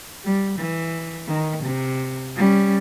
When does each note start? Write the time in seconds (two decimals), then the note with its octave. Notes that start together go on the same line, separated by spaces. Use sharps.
0.23 G3
0.58 E3
1.27 D#3
1.63 C3
2.36 G3 C#4